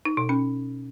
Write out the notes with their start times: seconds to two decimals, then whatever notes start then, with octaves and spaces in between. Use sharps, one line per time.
0.05 D#4
0.17 B2
0.29 C#4